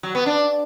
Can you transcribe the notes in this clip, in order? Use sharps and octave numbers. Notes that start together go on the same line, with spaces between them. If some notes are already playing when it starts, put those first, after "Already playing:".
F#3
B3
D4